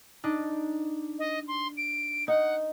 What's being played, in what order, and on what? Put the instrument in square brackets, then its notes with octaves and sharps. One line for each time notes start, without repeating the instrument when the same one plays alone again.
[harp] D4 D#4
[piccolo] D#5
C6
D7
[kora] D#4 [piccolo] F#5